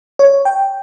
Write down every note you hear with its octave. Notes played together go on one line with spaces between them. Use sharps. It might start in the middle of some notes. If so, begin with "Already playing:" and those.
C#5
G5